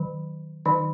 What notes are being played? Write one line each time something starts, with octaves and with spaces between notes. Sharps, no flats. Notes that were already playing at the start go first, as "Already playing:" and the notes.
Already playing: D#3 F#3
D#3 F#3 D#4